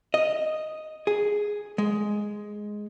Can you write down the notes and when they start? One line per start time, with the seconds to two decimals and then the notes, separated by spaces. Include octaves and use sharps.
0.14 D#5
1.07 G#4
1.78 G#3